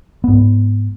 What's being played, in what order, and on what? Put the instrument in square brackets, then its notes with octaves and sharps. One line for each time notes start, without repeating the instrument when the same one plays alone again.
[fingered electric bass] G#2 B3